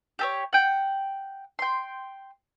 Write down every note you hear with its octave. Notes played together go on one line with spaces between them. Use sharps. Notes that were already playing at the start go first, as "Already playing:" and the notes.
G4 A4 C#5
F#5 G5
G5 C6